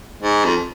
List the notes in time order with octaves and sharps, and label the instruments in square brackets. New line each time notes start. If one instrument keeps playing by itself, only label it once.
[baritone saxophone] G#2
F2